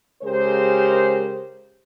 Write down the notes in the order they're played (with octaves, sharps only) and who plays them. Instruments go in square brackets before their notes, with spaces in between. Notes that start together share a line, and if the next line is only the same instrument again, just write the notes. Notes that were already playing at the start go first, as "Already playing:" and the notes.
[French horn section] C#3 G#3 G4 A#4 C5